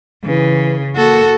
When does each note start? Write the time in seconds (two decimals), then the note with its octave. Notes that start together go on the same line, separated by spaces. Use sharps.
0.24 C#3 E3
0.96 A#3 F#4 A4